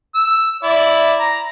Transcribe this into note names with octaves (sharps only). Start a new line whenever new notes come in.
E6
E4 D5
A#5